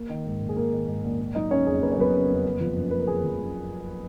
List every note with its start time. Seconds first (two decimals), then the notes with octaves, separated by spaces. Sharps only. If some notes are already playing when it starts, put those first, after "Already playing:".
Already playing: A#3
0.09 D#3
0.26 G#2
0.41 A#1
0.49 G#4
0.56 A#3 A#4
0.73 D#3
0.88 G#2
1.04 A#1
1.20 A#3
1.35 F#3 D#4 D#5
1.51 C#3 C#4 C#5
1.66 F2 G#4
1.82 A#3 B4
1.92 C#5
1.98 F#3 B3 B4
2.14 C#3
2.29 F2
2.45 F#1
2.61 F3
2.76 F#2
2.91 F#1 B4
2.99 A#4
3.07 F#1 G#4
3.24 F3
3.39 F#2